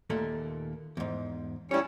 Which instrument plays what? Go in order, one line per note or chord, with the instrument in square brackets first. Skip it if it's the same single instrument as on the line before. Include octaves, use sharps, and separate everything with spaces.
[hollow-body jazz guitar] D#2 A#2 A3
E2 G#2
[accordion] G3 C#4 [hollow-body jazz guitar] E4 C#5